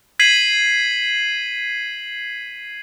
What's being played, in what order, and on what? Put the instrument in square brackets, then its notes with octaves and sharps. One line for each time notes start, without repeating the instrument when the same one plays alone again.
[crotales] G#6 B6 C7 D#7 F#7